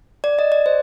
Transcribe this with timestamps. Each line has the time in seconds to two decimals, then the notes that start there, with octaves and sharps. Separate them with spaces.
0.24 D5
0.39 D#5
0.52 D5
0.66 C5